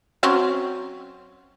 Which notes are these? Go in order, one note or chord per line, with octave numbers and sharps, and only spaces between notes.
F#3 C4 C#4